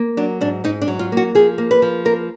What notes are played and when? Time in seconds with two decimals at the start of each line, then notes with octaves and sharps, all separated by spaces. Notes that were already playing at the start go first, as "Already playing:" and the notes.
Already playing: A#3
0.17 F#3 D4
0.41 G#2 D4
0.64 G#2 D#4
0.82 D4
0.88 F#3
0.99 F4
1.12 A#3 F#4
1.35 F3 G#4
1.58 A#3
1.71 B4
1.82 F3
2.05 A#3 A#4